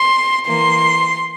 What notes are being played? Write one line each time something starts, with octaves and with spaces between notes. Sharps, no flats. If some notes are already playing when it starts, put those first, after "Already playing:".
Already playing: C6
E3 A#3 C6